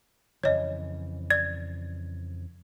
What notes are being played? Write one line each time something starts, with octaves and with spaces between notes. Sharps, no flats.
F2 C#3 E3 C#5 D#5
D5 G#6